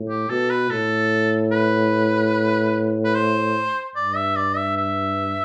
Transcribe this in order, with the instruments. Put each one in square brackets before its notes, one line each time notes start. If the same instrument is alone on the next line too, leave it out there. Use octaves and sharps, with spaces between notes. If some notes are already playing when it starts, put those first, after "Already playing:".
Already playing: [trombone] A2
[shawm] G4
[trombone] B2 [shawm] A4
[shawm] B4
[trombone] A2 [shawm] A4
[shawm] B4
B4
C5
[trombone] G2 [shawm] D5
[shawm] E5
D5
E5
E5